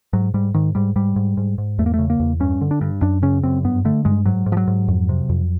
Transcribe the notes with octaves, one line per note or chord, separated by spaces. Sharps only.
G#2 F#3
G#2 G3
G#2 D#3
G#2 G3
G#2 G3
G#2
G#2
G#2
E2 A3
A#3
C#3 A3
A#3
E2
G2 C#4
D3
D4
G2
F#2 D4
C#3 C#4
F#2 C4
G2 B3
D3 A3
G2 G#3
G#2 F#3
G#2
F3
F#3
G#2
F2
C3
F2